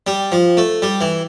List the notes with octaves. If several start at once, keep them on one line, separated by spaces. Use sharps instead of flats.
G3
F3
A3
G3
E3